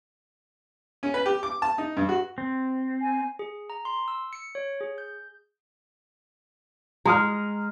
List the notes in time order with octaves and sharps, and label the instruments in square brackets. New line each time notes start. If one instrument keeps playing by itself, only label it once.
[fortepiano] C#4
B4
G4
D6
A5
D#4
G2
F#4
[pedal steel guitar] C4
[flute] G#5
[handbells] G#4
A#5
C6
E6
C#7
C#5
G#4
G6
[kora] G#3 [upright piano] A#5 D#6 F6